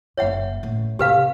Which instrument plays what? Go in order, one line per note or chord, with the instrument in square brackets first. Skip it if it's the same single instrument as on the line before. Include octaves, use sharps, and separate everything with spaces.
[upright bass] F#1 D3 [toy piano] C#5 E5 F#5
[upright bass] A1 A2
[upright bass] C3 [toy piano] G4 B4 F5